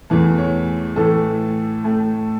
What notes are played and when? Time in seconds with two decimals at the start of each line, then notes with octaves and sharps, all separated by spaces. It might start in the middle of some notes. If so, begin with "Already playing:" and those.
0.10 E2 E3 A3
0.38 C#5
0.96 A2 E3 A3 A4
1.84 A2 A3